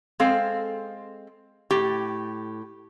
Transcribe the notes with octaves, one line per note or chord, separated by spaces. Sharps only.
G#3 C4 A4 F5
A2 G4